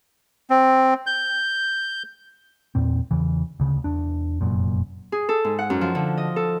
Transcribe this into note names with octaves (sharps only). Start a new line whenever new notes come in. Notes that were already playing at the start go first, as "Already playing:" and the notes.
C4
G6
E2 A#2 C4
E2 C#3 E3
D2 C#3
E2 D4
F1 F#2 A#2
G#4
A4
G#2
F#5
F#2
F3
D3
D#5
A4